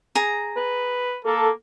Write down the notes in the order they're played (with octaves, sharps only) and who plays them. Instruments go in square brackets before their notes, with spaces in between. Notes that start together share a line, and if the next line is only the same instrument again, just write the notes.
[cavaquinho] G#4 A#5
[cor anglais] B4
[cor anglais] A#3 [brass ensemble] A4